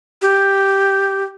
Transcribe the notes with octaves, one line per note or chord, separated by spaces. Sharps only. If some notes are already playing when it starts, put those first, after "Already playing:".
G4